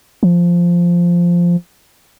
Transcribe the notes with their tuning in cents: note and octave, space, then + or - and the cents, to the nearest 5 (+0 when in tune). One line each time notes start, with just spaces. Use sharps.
F3 -5